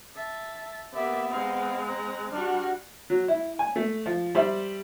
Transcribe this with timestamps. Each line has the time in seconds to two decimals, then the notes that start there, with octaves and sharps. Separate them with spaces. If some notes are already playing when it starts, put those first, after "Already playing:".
0.16 E5 A5
0.94 A#3 B3 G4 D5 E5
1.30 G#3 C4 F5 A#5
1.87 A#5 F#6
2.32 G3 D4 F#4 F6 F#6
3.10 F#3
3.28 E4
3.59 G#5
3.76 A3
4.06 F3
4.35 G3 C5 E5